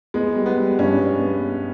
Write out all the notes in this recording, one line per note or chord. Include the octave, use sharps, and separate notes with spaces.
G#3 B3
G3
B3
G3
G2 C#4
B3
B3